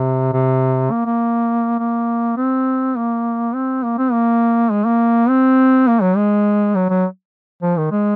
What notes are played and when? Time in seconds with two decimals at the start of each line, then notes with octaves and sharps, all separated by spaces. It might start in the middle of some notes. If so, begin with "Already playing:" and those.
Already playing: C3
0.33 C3
0.91 A#3
1.06 A#3
1.79 A#3
2.37 C4
2.96 A#3
3.55 C4
3.84 A#3
3.98 C4
4.13 A#3
4.71 G#3
4.85 A#3
5.29 C4
5.88 A#3
6.02 F#3
6.17 G#3
6.75 F#3
6.90 F#3
7.62 F3
7.77 D#3
7.91 G#3